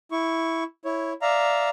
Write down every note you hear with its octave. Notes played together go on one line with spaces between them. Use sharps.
E4 C#6
E4 C#5
D5 E5 F5 A#5